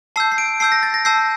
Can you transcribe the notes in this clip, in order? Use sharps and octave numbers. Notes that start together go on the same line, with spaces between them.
A5 E6 G6 C7
C7
D7
A5 E6 G6 C7
A#6
A6
A#6
A5 E6 G6 C7